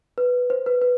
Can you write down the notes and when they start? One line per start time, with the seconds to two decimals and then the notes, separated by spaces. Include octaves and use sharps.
0.18 B4
0.50 C5
0.66 B4
0.82 B4